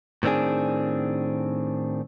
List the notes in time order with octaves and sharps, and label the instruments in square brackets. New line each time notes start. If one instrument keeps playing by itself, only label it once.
[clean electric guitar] A2 D#3 C4 D4 G#4